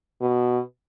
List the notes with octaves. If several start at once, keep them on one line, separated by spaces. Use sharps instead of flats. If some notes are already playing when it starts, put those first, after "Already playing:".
B2